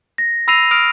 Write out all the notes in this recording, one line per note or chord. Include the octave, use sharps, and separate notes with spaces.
A#6
B5 E6 A#6 C7 D#7 F7
D#6 F6 D7 F7